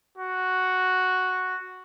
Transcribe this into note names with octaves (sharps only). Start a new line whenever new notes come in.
F#4